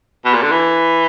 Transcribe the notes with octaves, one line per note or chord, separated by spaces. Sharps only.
B2
A#2
D3
E3